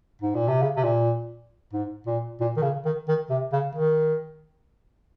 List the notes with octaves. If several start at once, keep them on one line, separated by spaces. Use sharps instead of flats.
G#2
A#2
C3
C#3
C3
A#2
G#2
A#2
A#2
D#3
C#3
D#3
D#3
C3
C#3
D#3